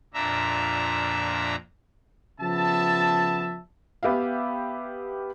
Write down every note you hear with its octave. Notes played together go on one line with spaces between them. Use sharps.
F2 A#2 D4 E5 A#5
C#3 F3 B3 E5 A5
B3 G4 E5 F5